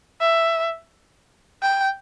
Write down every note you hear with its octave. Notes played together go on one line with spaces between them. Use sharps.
E5
G5